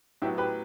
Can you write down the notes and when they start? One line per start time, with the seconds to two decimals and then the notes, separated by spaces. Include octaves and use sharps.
0.22 A2 F#3 B3 E4 G4
0.38 G4 B4